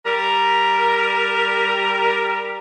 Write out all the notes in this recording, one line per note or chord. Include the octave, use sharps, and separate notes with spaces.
G3 A#4